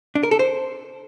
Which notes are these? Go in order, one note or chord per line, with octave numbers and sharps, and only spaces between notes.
D4
A#4
A4
C5